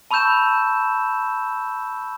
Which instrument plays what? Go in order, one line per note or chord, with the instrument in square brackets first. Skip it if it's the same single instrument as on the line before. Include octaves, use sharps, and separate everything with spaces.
[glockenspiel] A5 B5 C#6 E6 G6 E7